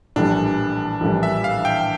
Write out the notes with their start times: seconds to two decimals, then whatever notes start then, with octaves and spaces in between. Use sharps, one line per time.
0.16 A#1 A2 E3 G3 D4
1.01 A#1 A2 E3 G3
1.23 E5
1.44 F5
1.65 G5